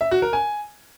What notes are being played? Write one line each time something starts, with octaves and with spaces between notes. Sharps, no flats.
E5
F#4
A#4
G#5